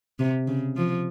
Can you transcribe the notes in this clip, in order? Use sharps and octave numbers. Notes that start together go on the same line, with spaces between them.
C3
C#3
F3